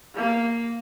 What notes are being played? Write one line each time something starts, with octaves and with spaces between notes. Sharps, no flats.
A#3